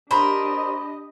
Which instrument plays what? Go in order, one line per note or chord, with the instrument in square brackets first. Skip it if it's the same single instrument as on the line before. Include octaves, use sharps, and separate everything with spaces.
[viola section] D4 G4 D#5 [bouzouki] A#4 C5 [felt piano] B5